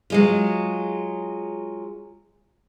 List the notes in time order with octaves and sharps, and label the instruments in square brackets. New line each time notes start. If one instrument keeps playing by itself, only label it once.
[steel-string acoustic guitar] F#3 G#3 F4